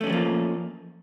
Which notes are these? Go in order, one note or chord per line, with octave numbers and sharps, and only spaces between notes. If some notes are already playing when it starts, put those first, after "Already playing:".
F3 G3 A3 A#3 C#4